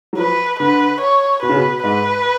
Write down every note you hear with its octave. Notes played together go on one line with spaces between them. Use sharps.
F#3
F3 B4
D3 B4
C#5
B2 B4
C#3
B2
G#2 B4